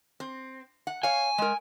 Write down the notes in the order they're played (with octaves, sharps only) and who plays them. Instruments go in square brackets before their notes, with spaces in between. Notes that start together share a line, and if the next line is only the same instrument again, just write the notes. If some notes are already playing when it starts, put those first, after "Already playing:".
[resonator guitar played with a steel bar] C4
F#5
[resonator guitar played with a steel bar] C#5 F5 [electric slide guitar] G#5
[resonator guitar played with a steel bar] G#3 A#4